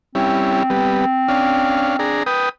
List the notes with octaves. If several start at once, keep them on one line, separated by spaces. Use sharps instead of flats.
G3 C4 C#4 E4
G3 B3
C#4 D4 F5
D4 G#4 A#5
B4 G5 D#6